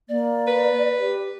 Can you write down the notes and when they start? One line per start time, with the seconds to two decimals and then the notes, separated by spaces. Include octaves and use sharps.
0.09 A#3 D5
0.47 B4
0.99 G4